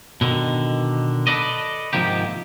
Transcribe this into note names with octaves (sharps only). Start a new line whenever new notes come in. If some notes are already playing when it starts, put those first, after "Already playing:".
B2 D3 D#3
A4 B4 D5 D#5
G#2 C3 D#3 F3 A#3 G4